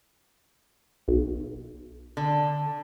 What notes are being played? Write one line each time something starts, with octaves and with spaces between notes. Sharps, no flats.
B1
D3